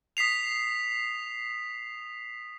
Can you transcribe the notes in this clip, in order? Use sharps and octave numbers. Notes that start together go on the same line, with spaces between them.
D#6 B6 C7 F7